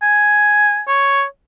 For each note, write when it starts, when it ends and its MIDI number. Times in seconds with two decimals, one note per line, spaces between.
0.02 0.82 80
0.88 1.24 73